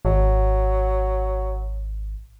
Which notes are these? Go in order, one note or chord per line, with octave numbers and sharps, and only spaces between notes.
G#1 F#3